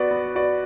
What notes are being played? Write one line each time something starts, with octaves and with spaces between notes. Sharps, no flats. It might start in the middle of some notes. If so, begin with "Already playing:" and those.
Already playing: B3 F#4 B4 D5
B3
F#4 B4 D5